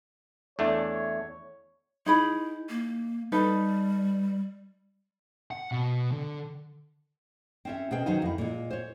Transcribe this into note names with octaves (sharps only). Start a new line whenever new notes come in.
E2 A3 D4 C#5
D#4 E4 G#4 B5
A#3
G3 D#4 A4 B4
F#5
B2
D3
C4 C#4 E5
B2 C#4 G#4 C5 G5
D#3 F#3 D#4 C5 F5 G#5
F2 E4
A#2 G#3
C5 C#5